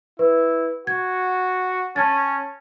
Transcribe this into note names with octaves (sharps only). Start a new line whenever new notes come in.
E4 B4
F#4 G#6
C#4 A5 G#6 A6